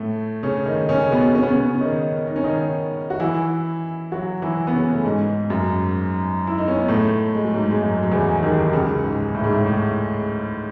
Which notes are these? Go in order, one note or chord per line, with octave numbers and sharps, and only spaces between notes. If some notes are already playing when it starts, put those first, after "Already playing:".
Already playing: A2 A3
C#3 C#4
D#3 D#4
C#3 C#4
B2 B3
C#4
B3
C#3 C#4
C#4
D#3 D#4
D#4
C#4
D#3 D#4
F#4
E3 E4
F#3 F#4
E3 E4
B3
C#3 C#4
A3
G#2 G#3
F#2 F#3
E4
D#4
C#4
B3
A2 A3
G#3
F#3
G#2 G#3
G#3
F#2 F#3
F#3
E2 E3
D#2 D#3
C#2 C#3
G#2
A2
G#2
A2
A2